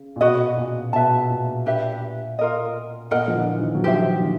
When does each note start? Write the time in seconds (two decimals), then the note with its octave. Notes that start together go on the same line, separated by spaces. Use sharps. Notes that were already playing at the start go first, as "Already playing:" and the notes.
Already playing: C#3
0.16 A#2
0.21 B2 F#4 B4 D#5
0.57 A#2
0.93 B2 B4 E5 A5
1.30 A#2
1.66 D4 G4 B4 E5
2.39 F4 A#4 D#5
3.11 A#2 A#4 D#5 F#5
3.28 F3
3.35 D3 E3
3.60 D#3 F3
3.75 F#3
3.84 D#3 F3 G4 C5 E5
4.20 D3 E3